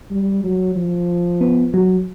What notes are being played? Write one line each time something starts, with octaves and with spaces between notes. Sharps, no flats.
G3
F#3
F3
B3
F#3